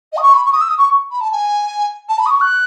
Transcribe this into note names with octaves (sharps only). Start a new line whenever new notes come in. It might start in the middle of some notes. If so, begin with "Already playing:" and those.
D#5
D#6
C#6
B5
C#6
D#6
E6
D#6
C#6
B5
A5
G#5
A5
B5
D#6
C#6
F#6